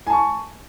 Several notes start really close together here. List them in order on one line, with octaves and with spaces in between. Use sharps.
G#5 A5 C#6